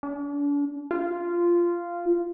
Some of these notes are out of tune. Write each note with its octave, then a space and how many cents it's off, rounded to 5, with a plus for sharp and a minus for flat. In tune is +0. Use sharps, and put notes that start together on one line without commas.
D4 -40
F4 -10